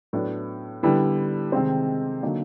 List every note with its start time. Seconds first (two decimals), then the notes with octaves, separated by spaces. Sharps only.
0.13 A2 F#3 B3 D4
0.83 D3 G3 B3 E4
1.52 C3 D#3 G#3 C4
2.23 D3 F#3 A#3 D#4